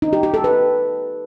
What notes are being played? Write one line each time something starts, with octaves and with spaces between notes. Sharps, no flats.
D#4
G4
G4
A4
B4